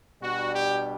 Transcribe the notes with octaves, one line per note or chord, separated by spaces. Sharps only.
B2 G3 D4 F#4
G4